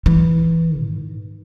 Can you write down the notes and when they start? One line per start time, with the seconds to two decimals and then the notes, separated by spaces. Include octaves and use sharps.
0.06 E3
0.83 G#2